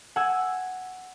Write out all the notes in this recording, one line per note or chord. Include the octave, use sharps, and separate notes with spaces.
F#5 G#5 E6 G#6